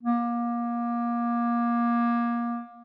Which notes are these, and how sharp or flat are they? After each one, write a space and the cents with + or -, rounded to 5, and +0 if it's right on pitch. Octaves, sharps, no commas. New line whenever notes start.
A#3 +25